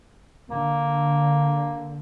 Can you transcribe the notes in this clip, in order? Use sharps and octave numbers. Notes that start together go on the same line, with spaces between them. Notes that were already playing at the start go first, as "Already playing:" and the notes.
D3 A#3